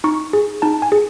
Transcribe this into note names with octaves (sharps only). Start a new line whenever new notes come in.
D#4 C#6
G#4
D#4 A5
G#5
G#4